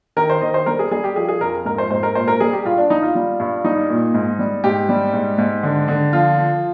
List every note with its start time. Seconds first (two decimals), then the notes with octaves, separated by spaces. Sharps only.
0.17 D#3 A#4
0.30 C5
0.41 D#3 D#5
0.54 C5
0.66 G3 A#4
0.79 G#4
0.91 G3 G#4
1.04 G4
1.16 F3 G#4
1.29 G#4
1.41 F2 A#4
1.65 G#2 A#4
1.78 C5
1.90 G#2 C5
2.03 A#4
2.15 A#2 C5
2.28 A#4
2.40 G3 G#4
2.53 G4
2.65 G2 F4
2.77 D4
2.90 G3 D#4
3.02 F4
3.15 G3
3.40 G2
3.64 G3 D#4
3.90 A#2
4.14 G#2
4.39 G3
4.64 G#2 G4
4.89 G3
5.13 G#2
5.38 G#2
5.63 D3
5.88 D3
6.13 F3 F4
6.37 F3